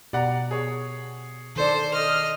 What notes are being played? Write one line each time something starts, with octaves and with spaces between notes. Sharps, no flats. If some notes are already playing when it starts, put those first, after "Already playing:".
B2 G4 D5 F#5 A#5
G#4 C#5
D#3 A4 C5 D5
D#5 F6